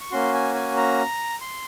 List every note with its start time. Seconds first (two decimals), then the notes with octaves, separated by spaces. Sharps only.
0.01 C#6
0.11 A#3 C#4 F#4 C6
0.34 G#5
0.55 G#5
0.77 A#5
1.41 C6